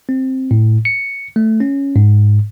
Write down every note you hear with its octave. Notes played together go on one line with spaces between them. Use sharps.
C4
A2
C#7
A3
C#4
G#2